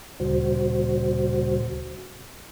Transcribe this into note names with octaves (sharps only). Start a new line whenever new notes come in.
D2 A#2 C#3 G3 F#4 C5